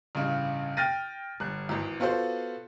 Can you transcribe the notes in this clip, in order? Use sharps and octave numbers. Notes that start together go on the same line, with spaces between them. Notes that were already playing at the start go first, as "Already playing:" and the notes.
A1 G2 C#3
G5 F6 A6 A#6 D#7
G1 F#6
G#1 E2
B3 F4 F#4 A4 C5